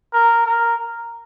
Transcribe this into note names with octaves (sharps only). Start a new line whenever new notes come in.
A#4
A#4